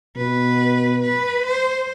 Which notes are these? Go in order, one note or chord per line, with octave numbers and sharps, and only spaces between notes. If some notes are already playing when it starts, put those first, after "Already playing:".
B2 B4
B4
C5